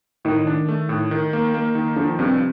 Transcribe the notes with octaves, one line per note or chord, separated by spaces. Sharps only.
A2 D#3
D4
A3
A2
D#3
A#3
A#3
D#3
D3 F3
G2 C3